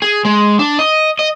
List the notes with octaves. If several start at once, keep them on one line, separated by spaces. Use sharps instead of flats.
G#4
G#3
D4
D#5
D#5